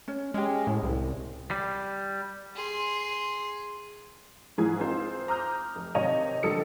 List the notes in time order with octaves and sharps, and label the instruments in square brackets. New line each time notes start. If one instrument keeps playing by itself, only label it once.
[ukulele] C#4
[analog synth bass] G#3 [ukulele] C#4 G4
[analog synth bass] A2
C2
[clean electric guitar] G3
[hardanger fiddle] G#4 C6
[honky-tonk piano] G#2 E3 F3 G#4 D#6 G#6
C4 D#4 F4 C5
A#5 D6 D#6 F6 G6
F1
C3 D#3 C#5 D#5 D#7 F7
A#1 D3 G3 A4 D#6 C#7